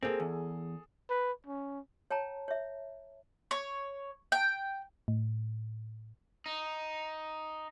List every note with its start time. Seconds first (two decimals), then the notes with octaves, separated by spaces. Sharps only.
0.03 A#3 C4 G#4 A4
0.20 E2
1.10 B4
1.47 C#4
2.11 C#5 G5 A5 A#5
2.48 C#5 E5
3.51 C#5
4.32 G5
5.08 A2
6.46 D#4